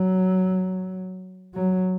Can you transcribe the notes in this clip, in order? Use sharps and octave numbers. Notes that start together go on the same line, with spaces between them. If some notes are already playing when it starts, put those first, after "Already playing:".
Already playing: F#3
F#3